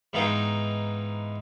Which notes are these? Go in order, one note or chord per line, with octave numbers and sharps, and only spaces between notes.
G#2 E3 B3 D#4 F5 G5